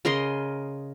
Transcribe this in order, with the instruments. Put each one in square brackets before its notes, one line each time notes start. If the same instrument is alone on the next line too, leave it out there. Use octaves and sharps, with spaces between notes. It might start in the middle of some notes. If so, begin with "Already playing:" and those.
[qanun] C#3 A#4 D#5 C6